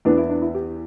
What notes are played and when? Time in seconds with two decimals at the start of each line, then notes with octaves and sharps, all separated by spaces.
0.05 E2 E3 B3 D4
0.17 E4
0.29 D4
0.42 E4
0.55 G4